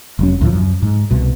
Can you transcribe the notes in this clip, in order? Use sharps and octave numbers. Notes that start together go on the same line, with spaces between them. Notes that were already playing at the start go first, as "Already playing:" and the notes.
F1 F#3 C#4
D2 A2 F3
F#2
G#2
C2 B2